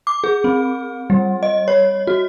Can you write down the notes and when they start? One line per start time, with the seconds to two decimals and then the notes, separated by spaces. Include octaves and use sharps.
0.07 D6
0.24 G#4
0.44 C4
1.10 G3
1.43 D#5
1.68 C#5
2.07 F#4